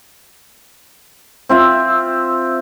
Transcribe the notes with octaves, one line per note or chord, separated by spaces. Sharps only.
C4 F4 E5